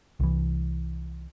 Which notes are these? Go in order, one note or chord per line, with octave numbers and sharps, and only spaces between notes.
C2 E3